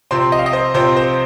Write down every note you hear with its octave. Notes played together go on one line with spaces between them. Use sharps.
C3 F3 C4 C6
D#5
F5
D#5
C5
C3 F3 C4 C5
C5